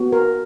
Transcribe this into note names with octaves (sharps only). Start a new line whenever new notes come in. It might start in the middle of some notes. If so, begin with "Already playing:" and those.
Already playing: B3 F#4
A#4